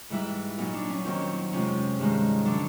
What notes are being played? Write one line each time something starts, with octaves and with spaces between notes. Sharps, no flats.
G#2 E3 G3 E4
A#2 F#3 D#4
D4
C#4
D#2 D#3 F#3 C4
F2 C3 F3 G#3 C#4
G2 D#3 G#3
D3 F#3 D4